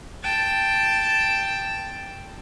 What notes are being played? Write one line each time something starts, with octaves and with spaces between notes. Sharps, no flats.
G5 A5